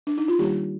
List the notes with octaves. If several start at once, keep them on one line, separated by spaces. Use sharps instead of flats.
D4
D#4
F4
D#3 G3 A#3 D4 G4